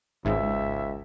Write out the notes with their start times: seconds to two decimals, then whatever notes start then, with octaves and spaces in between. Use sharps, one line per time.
0.25 G#1 C#2 G#2 G#3 E5